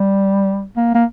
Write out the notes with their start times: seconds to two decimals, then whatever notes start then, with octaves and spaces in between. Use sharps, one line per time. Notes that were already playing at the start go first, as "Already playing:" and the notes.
Already playing: G3
0.77 A#3
0.95 A#3